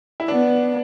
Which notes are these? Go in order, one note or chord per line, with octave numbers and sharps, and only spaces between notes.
E4
B3 D4